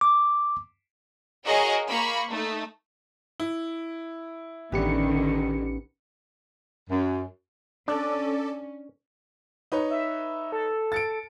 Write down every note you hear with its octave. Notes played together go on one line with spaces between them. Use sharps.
D6
F#4 G#4 A#4 C#5 D#5 F5
A#3 B5 C#6
A3 D#4
E4
A1 D3 D#3 B3 C#4 G4 C#7
F#2
C#4 D4 A4 D5
D#4 B4 C#5
E5
A4
A6 C#7 D7